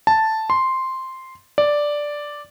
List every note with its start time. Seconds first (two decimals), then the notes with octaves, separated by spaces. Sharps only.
0.07 A5
0.50 C6
1.58 D5